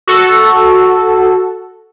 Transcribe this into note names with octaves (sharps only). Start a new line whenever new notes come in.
F#4 A4